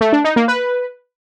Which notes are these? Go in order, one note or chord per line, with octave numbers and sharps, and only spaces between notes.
A3
D4
D#4
A#3
B4